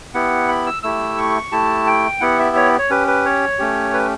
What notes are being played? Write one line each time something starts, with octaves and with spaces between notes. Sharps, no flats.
B3 E4 G4 F#5
B5
E6
A3 E4 G4 E6
C#6
A3 E4 G4 A5
G5
B3 E4 G4 F#5
E5
C#5
C#5
C#4 G4 B4
B4
C#5
A3 C#4 G4
B4